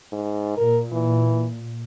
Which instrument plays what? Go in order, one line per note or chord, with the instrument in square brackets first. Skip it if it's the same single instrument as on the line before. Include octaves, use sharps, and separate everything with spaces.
[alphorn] G#2
[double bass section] A#2 [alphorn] A#4
[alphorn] E3